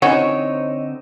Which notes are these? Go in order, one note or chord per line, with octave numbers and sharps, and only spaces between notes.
D3 E3 C4 C#4 D#4 F#4 C#5 D#5